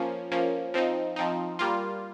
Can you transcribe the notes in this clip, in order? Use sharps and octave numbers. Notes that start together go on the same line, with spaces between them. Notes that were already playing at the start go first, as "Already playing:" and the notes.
Already playing: F3 A#3 C#4
F3 A#3 C#4
F3 C4 D#4
F3 C4 D#4
G3 A#3 F4